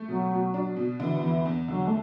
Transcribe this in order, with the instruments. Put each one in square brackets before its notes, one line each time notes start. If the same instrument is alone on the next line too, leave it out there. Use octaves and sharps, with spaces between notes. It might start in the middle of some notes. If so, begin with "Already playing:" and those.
Already playing: [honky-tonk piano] A3
[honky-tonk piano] B2 [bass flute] F#3
[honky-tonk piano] B2
D4
B2
[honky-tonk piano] D3 [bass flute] E3
[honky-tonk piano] E2 [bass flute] E3
[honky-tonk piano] E2
[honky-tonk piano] D3 [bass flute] F#3
[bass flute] A3